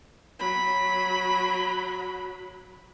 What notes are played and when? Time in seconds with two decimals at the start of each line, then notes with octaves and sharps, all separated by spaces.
0.39 F#3 B5